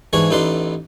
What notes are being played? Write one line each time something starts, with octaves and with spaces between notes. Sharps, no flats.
G#2 E3 D4 G#4 C#5
A1 A2 D#4 B4 D5 C6